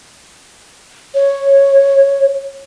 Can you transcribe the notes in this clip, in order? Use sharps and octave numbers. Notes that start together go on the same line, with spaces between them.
C#5